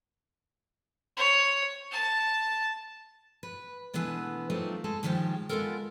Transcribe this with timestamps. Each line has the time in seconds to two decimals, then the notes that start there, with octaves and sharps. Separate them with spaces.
1.17 C#5
1.91 A5
3.43 B4
3.94 B2 E3 G#3 A3 B3 D4
4.50 F#3 A3 A#3 C4 D#4 F4
4.84 G#3 G#4 A4
5.03 A2 D#3 F3 G3 G#3 G4
5.49 G#3 B3 C4 F4 A4 A#4